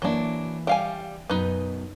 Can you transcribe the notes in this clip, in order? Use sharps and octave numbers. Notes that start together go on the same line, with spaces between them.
E3 F#3 A#3 D4 E4
G3 D5 E5 F5 G5 G#5
F#2 B2 D#4 B4